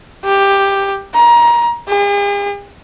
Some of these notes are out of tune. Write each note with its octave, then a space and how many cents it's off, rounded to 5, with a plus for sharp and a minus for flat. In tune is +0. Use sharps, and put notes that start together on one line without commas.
G4 +10
A#5 +25
G#4 -45